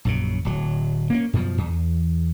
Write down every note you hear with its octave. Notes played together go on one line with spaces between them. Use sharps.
A#1 F#2 C#3
D1 F#3
A#3 B3 C#4
F#2 B2 E3 F3
E2